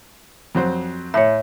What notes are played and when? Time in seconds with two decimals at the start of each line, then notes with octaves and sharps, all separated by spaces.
0.55 F2 F#3 C5
1.14 A2 C#5 E5